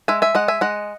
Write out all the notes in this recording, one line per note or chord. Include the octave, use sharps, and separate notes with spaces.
G#3 E5 G#5
E5 G#5
G#3 D#5 F#5
E5 G#5
G#3 D#5 F#5